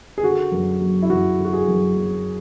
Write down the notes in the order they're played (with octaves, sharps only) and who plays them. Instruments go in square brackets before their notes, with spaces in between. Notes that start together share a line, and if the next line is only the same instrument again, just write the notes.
[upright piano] G#4
D3 F#4
F#2
F#3
E4
F#2 F#4
D3
F#4
G#4
F#2
F#3